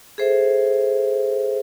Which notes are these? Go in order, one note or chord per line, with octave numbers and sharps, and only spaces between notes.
G#4 A4 C5 E5